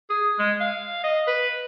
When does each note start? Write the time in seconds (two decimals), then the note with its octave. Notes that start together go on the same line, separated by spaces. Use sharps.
0.10 G#4
0.39 G#3
0.61 F5
1.04 D#5
1.28 B4